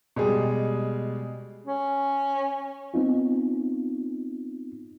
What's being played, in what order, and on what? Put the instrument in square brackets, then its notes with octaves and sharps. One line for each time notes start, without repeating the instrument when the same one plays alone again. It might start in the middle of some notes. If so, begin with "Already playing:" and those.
[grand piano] B2 G3 G#3 G#4
[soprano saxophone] C#4
[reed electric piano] B3 C4 D#4 F4